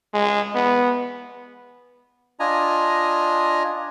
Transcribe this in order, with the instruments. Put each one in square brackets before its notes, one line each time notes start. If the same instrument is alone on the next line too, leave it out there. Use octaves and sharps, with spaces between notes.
[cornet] G#3
B3
[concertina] D4 F4 D#5 G#5 A#5